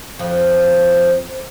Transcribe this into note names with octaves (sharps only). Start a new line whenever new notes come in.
F2 F3